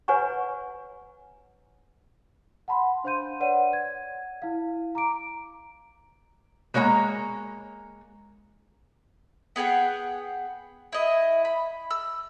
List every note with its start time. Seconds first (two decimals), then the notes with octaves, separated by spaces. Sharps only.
0.08 B4 C#5 F#5 G#5 A#5 C#6
2.68 F#5 A5 B5 C6
3.04 D4 C5 F5 C6 G6 D#7
3.40 B4 C#5 D5 F#5 D#7
3.73 G#6
4.42 E4 F5
4.95 A#5 D6 D7
6.74 G#3 A#3 C#5 F#5 A#5
9.56 B3 G#4 F#5 G5
10.93 E4 D#5
11.45 B5
11.90 E6